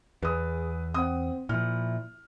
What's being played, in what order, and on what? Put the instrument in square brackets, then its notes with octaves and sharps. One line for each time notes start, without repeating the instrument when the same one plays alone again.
[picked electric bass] E2 [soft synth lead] G#4 [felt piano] B4 D#6
[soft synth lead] C4 [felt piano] F#5 D#6
[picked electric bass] A#2 F3 [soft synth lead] E4 [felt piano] F6